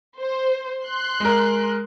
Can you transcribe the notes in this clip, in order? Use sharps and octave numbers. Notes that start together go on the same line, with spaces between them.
C5
C6 F#6
G#3 A#4